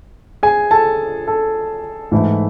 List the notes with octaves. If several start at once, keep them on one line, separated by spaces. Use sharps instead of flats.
G#4 G#5
A4 A5
A4
G#2 E3 A3 E4